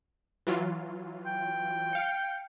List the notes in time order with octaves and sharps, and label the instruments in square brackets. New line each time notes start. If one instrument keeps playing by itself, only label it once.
[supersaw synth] E3 F#3 F4
[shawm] G5
[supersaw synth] F5 C#7